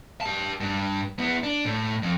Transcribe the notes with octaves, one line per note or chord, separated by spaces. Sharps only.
G4 A5
G2
B3 E4
D4
A2
F2